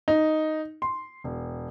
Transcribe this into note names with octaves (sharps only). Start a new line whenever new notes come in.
D#4
C6
E1